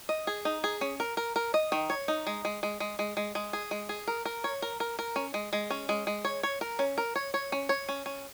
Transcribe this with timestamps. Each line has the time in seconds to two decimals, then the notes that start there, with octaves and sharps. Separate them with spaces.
0.09 D#5
0.27 G#4
0.45 D#4
0.64 G#4
0.81 C#4
1.00 A#4
1.17 A#4
1.36 A#4
1.54 D#5
1.72 D#3
1.90 C#5
2.08 D#4
2.27 G#3
2.45 G#3
2.63 G#3
2.80 G#3
2.99 G#3
3.17 G#3
3.35 G#3
3.53 G#4
3.71 G#3
3.89 G#4
4.08 A#4
4.25 A#4
4.44 C#5
4.62 A#4
4.80 A#4
4.99 A#4
5.16 C#4
5.34 G#3
5.53 G#3
5.71 C#4
5.89 G#3
6.07 G#3
6.25 C#5
6.43 C#5
6.61 A#4
6.79 C#4
6.98 A#4
7.16 C#5
7.34 C#5
7.52 C#4
7.69 C#5
7.89 C#4
8.06 C#4